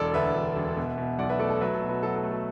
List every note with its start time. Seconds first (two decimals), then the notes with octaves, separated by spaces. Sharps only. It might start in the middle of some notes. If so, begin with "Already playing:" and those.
Already playing: E1 A4 D5
0.14 D2 B4 E5
0.35 E1
0.56 E1
0.77 B2
0.98 B2
1.19 B1 D5 F#5
1.29 B4 E5
1.39 A3 A4 D5
1.50 A4
1.61 F#3 B4 E5
1.74 A4
1.81 B2
1.89 F#4 B4
2.03 F#3 A4
2.16 A4
2.23 A3
2.30 A4